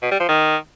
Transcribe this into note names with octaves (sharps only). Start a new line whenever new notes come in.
B2
G3
F3
D#3